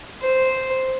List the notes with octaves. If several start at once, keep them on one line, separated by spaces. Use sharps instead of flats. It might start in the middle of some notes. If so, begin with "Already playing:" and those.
C5